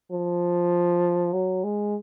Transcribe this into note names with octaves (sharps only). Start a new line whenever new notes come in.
F3
F#3
G#3